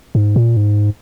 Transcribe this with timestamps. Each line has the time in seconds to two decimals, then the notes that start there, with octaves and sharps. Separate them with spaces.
0.15 G#2
0.36 A#2
0.57 G#2